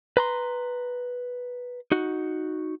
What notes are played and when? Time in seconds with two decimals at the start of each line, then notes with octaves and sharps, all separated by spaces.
0.17 B4 A#5 C6
1.92 D#4 F#4